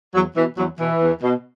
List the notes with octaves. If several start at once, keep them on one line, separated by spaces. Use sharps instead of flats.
E2 F#3
B2 E3
E2 F#3
B2 E3
E2
B2